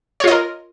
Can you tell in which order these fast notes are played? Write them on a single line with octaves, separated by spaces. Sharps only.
C#5 F4 D#5 A#4